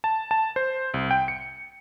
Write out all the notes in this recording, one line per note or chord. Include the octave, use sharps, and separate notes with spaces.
A5
A5
C5
C2
G5
C#7